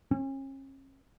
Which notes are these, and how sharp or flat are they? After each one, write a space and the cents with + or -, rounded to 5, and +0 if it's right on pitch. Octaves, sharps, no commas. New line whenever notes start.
C#4 -40